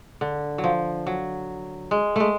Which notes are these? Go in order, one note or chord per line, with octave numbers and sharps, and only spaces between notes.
D3
F#3
F3
F#3
G#3
G#3 A3